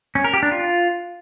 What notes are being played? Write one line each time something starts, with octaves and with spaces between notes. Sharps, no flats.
C#4
A#4
G4
D4
F4